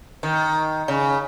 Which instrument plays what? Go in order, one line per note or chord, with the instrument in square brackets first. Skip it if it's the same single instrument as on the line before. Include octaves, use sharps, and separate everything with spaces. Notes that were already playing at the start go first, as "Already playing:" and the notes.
[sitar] D#3
C#3